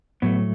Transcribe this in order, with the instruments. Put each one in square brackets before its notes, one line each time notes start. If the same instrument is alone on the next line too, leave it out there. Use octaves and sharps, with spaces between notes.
[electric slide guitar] A2 F#3 A3 B3